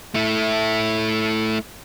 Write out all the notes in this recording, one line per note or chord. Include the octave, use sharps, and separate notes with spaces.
A3 E4